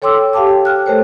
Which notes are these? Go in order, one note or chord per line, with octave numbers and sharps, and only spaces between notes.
A4 C#5 G5 C6 D6 E6
G4 F5 G5 A5 D6
G5 F6 F#6
A3 A4 A#4 C5 C#5